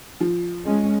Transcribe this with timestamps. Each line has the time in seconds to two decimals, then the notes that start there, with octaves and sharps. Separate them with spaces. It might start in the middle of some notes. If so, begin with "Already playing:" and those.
0.20 F3
0.63 G#3 C#4